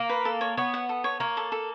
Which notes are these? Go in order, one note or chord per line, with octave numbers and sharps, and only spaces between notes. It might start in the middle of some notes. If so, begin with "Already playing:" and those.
Already playing: A#3
B4
A4
C#5
B3 C#5
F#5
A4
C#5
A#3 C#5
A4
A4